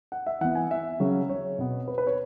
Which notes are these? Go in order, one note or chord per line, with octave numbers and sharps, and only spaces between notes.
F#5
E5
E3 B3 F#5
G#5
E5
C#3 F#3 C#4
C#5
B2 B3
B4
B4
C#5